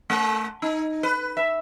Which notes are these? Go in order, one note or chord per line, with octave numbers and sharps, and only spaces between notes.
A3
D#4
B4
E5